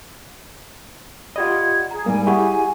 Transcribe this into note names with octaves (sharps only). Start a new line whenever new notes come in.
F4 G4 D5 D#5 F#5 B5 G#6
G#4 A#5
G#2 G3 A#3 G#5
E4 G4 G#4 F#5 C#6